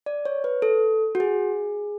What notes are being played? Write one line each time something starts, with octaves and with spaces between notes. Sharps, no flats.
D5
C#5
B4
A4
F#4
G#4